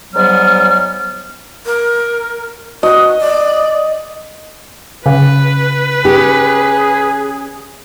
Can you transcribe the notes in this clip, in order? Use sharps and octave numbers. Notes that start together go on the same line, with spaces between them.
G#2 F#3 G3 B3 F6
A#4
F#4 D#5
D5
C#3 B4
C#4 G4 G#4